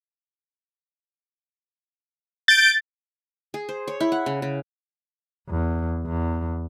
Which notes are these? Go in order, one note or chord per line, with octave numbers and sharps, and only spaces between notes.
G6 A6 D7
G#4
C5
C#5
E4
F#5
C#3
C#3
E2
E2